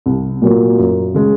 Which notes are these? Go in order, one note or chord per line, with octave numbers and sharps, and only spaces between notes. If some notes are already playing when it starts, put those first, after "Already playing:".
C2
A#2 F#3 A#3 F4
F#2
C#3 G#3